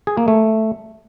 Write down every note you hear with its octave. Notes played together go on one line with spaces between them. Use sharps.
G#4
A#3
A3